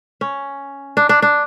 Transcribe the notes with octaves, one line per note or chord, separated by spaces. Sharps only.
C#4
D4
D4
D4